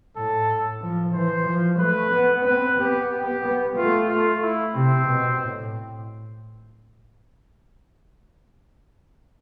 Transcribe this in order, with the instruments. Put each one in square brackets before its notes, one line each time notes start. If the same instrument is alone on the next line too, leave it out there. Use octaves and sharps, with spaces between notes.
[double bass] A2 [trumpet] A4
[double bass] F3
[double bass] E3 [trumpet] C5
[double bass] F3
[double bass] A3 [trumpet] B4
[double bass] B3
[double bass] C4 [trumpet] B4
[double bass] B3 [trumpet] G4
[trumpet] G4
[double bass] B3
[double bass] A3 [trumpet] F4
[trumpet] F4
E4
[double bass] C3 [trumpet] C4
[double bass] B2
A2